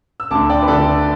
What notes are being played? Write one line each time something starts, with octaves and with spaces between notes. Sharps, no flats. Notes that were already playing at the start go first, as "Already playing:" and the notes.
E6
D2 D3 A5 D6
D5 G5
B4
D2 D3 A4 D5